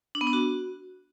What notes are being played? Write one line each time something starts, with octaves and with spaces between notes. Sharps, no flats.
D4
B3
D4
F#4